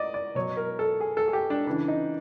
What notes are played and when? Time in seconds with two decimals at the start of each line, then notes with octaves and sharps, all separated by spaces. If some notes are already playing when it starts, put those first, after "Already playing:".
Already playing: D5 D#5
0.14 D5
0.35 B2 F#3 C#5
0.57 A#4
0.79 A4
1.01 G#4
1.17 A4
1.28 G#4
1.33 G4
1.50 D4
1.67 C#3 E3 D4
1.88 D#4